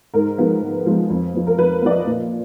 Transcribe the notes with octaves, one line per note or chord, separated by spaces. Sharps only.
G#2 A#4
F3 G#3 B3
G#2
F3 G#3 B3
F2
F3 B3
A#4
F2 B4
F3 B3 D5
D#5
A#2